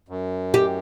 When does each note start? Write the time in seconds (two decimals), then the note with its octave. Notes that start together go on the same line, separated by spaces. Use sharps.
0.09 F#2
0.54 G4